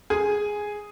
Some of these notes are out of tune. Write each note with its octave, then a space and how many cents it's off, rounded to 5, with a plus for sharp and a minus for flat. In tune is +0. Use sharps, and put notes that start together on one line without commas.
G#4 +0 G#5 +0